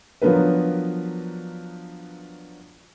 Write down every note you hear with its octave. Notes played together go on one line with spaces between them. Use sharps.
F3 F#3 B3 D4 A#4 B4